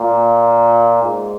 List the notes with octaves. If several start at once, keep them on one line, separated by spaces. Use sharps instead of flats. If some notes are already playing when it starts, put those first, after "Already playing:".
Already playing: A#2
G#2